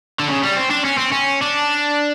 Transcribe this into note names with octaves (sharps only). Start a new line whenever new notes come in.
D3
C#3
G3
C4
D4
C#4
C4
C#4
D4